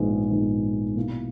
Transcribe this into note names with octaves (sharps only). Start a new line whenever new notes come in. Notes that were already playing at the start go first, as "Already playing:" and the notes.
Already playing: A#1 G#2 D#3 G#3 B3
A#1 G#2 D#3 G#3 B3
B2 A#3 E4